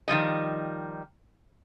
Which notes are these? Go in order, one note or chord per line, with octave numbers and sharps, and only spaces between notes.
D#3 F3 G3 D#5